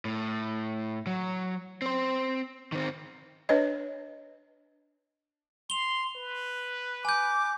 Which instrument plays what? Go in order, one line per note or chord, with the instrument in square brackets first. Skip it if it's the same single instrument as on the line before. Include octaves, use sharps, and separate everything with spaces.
[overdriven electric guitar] A2
F#3
C4 C5
D#3 C4
[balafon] D4 B4 C#5 D#5
[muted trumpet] C6 [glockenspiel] F7 G7
[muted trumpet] B4
[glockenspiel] G#5 G6 [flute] D6